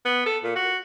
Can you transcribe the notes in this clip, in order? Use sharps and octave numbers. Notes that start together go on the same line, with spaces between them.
B3
A4
A#2
F#4